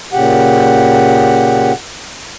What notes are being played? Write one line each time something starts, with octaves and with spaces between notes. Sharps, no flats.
A#2 C#3 G4 F#5